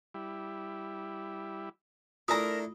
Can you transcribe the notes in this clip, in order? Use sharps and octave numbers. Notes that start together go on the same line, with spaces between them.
G3 E4
A3 D4 E4 F4 A#4 A#5 D#6